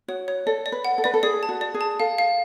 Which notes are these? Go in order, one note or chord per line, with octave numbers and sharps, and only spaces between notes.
F#4 C#5
C#5
A4 D5
D5
B4
F#5
A4
B4 D5
A4
G#4 D5
A5
F#4
D5
G#4
A5
A4 F5
F5